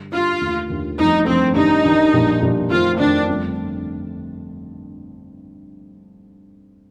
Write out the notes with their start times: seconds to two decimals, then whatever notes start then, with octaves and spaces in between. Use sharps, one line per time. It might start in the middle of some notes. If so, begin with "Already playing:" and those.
Already playing: G2 D3 G3
0.13 G2 D3 G3 F4
0.41 D#2 D3 A3
0.70 D#2 D3 A3
0.99 G1 F2 D3 F3 A3 D#4
1.27 G1 F2 D3 F3 A3 C4
1.56 A1 G2 D#3 G3 D4 D#4
1.84 A1 G2 D#3 G3 D4
2.13 A#1 A#2 G3 D4
2.42 A#1 A#2 G3 D4
2.71 F2 D#3 A3 C4 F4
2.99 F2 D#3 A3 C4 D4
3.28 G1 F2 D3 A3